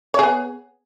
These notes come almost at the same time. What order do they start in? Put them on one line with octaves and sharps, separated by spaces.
C#5 G#4 B3